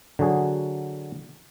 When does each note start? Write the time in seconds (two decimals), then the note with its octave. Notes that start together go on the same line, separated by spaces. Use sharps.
0.19 D3 F#3 F#4 G#4